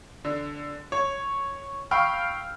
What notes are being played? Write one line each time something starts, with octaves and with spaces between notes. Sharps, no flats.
D3
C#5
F5 G5 B5 C#6 E6 F6